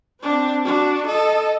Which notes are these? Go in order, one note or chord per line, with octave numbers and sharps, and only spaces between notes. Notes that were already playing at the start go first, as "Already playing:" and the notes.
C4 D4
D4 F#4
A4 D#5